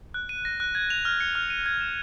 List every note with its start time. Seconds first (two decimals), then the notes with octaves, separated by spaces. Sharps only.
0.14 F#6
0.29 D#7
0.45 A#6
0.60 F#6
0.75 G#6
0.90 F7
1.05 F6
1.20 C#7
1.35 F6
1.50 D#7
1.66 G#6
1.81 E7